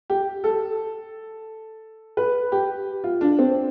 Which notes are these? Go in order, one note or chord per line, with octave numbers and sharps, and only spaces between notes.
G4
A4
B4
G4
F4
D4
C4